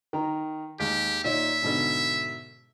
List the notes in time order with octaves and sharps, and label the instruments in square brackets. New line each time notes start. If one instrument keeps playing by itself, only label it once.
[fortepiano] D#3 A#5
[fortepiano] D#2 G#3 [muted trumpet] G4
[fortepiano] A#2 D#4 C#5 [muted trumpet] E5
[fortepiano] G#2 B2 D3